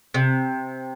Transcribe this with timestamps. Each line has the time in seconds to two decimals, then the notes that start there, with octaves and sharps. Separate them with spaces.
0.14 C3